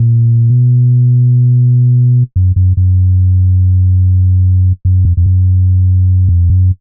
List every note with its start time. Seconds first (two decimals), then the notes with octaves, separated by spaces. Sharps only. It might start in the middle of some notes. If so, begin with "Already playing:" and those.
Already playing: A#2
0.50 B2
2.36 F#2
2.56 F#2
2.77 F#2
4.85 F#2
5.05 F2
5.17 F2
5.26 F#2
6.29 F2
6.50 F#2